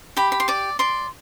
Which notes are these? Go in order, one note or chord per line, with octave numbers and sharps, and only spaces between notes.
G4 B5
B5
C6
D5 D6
D5 C6